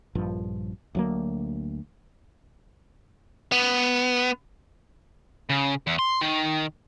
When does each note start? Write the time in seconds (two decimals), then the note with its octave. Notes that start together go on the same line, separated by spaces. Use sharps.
0.15 A#1 G2 F3
0.95 D2 F#3 A#3
3.52 B3
5.50 C#3
5.87 E2
5.99 C6
6.21 D#3